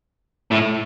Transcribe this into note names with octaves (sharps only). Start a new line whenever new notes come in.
A2